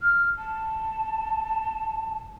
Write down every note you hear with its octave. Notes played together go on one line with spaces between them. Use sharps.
F6
A5